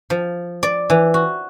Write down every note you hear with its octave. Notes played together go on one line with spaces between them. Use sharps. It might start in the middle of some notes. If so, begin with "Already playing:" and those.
F3
D5
E3
F#4